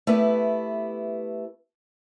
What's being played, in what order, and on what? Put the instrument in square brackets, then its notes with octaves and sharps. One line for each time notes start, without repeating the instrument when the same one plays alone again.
[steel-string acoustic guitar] A3 B3 E4 G4 B4